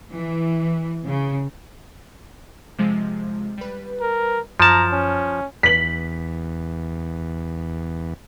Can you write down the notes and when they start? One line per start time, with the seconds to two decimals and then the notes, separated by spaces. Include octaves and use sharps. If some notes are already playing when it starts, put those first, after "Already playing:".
0.12 E3
1.04 C#3
2.78 C3 F3 G#3
3.58 G3 B4
4.01 A#4
4.60 F#2 F3 A5 A#5 F6
4.92 C#4
5.63 E2 B6 F#7